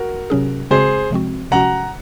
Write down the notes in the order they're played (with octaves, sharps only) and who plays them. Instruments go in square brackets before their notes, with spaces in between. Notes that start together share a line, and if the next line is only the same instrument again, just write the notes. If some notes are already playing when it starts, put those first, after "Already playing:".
Already playing: [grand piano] F#4 A#4
[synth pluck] C3 F#3 C#4 G#4
[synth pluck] C#3 G#3 C4 F#4 [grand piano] G#4 C5
[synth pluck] C3 F3 G#3 C4 F#4
[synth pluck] C3 F3 G#3 C#4 F#4 [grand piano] F#5 A#5